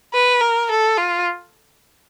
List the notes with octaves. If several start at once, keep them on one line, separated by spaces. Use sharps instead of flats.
B4
A#4
A4
F4